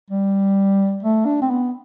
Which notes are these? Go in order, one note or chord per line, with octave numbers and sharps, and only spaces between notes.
G3
A3
D4
C4
B3